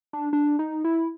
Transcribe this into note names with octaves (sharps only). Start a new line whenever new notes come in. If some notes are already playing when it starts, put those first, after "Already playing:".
D4
D4
D#4
E4